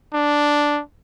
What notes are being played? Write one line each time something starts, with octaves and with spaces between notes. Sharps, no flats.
D4